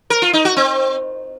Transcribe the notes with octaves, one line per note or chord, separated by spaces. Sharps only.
A#4
F4
D#4
F#4
C4